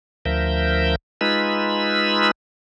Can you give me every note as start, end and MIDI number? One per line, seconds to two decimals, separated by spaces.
0.25 0.95 38
0.25 0.95 53
0.25 0.95 70
0.25 0.95 76
0.25 0.95 91
1.21 2.31 56
1.21 2.31 63
1.21 2.31 65
1.21 2.31 71
1.21 2.31 83
1.21 2.31 88